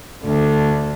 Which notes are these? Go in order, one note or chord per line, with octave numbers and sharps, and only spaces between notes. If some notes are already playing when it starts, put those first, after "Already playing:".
D2 D3